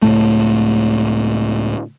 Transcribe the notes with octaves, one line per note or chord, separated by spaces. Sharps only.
C#2 A2 A3